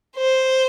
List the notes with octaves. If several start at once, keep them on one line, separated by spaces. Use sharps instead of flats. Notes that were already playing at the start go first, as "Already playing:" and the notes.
C5